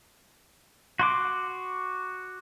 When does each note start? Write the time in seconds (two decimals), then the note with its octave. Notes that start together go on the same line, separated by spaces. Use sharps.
0.99 F#4 C6 D6